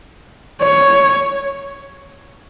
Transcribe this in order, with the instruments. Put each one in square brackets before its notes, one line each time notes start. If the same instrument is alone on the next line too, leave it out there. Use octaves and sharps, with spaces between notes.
[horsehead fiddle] C#5